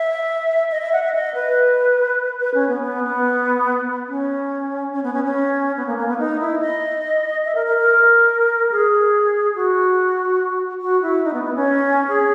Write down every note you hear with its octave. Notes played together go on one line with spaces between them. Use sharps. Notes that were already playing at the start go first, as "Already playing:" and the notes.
Already playing: E5
D#5
E5
F#5
E5
D#5
B4
B4
C#4
B3
B3
B3
C#4
C#4
B3
C#4
C#4
B3
A#3
A#3
B3
D#4
E4
D#5
E5
A#4
A#4
A#4
G#4
F#4
F#4
E4
D#4
B3
B3
C#4
G#4